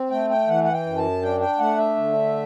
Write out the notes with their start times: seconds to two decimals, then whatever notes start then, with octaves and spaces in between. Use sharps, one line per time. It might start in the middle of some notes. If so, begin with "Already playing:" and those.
Already playing: C4
0.11 A3 G5
0.30 G5
0.48 E3 F#5
0.64 F#5
0.73 G5
0.86 F#2
0.98 A5
1.22 D4 G5
1.40 G5
1.59 A3 F#5
1.77 E5
1.96 D3